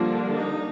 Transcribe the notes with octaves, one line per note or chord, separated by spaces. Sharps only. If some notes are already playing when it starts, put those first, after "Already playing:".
Already playing: D3 F3 G3 A#3 D4 F4
D#4